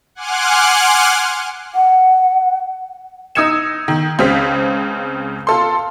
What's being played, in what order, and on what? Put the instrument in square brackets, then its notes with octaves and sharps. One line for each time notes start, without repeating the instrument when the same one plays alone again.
[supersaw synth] F#5 G#5 C6 D6 F6 F#6
[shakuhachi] F#5
[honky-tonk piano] D#4 D#6 E6 G#6 C#7 E7
D#3
C#2 C#3 C4 B6
F4 A4 C6